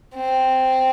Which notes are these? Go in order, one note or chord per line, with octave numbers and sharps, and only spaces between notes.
C4